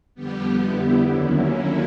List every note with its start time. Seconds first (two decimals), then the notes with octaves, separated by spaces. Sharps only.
0.15 F2 D3 G3 B3 G4
0.62 E4
1.09 D#2 D3 F#3 A#3 C#4